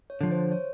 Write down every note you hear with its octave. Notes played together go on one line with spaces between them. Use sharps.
C#5
D3 F3
C5
C#5